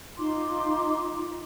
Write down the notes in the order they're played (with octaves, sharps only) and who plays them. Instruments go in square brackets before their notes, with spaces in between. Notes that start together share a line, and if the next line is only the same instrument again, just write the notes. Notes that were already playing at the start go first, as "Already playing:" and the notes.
[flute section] D#4 F4 C6 D6